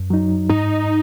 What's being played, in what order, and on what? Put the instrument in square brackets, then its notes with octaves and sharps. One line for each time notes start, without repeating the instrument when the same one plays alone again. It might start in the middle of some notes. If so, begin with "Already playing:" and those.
Already playing: [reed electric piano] F#2
F#3 D#4
[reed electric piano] G#2 [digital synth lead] D#4